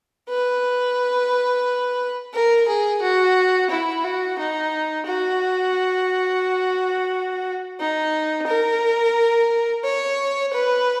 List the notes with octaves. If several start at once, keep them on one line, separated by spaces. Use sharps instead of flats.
B4
A#4
G#4
F#4
E4
F#4
D#4
F#4
D#4
A#4
C#5
B4